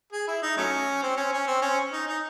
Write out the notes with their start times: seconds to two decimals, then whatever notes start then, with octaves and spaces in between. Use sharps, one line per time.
0.13 G#4
0.28 E4
0.43 D#4
0.57 F#3 A3 C#4
1.03 C4
1.17 C#4
1.33 C#4
1.47 C4
1.62 C#4
1.93 D#4
2.08 D#4